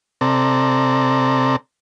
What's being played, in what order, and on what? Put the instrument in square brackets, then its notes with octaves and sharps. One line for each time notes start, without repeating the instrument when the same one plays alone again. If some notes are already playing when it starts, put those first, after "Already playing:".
[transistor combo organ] C3 C4 A4 D5 A#5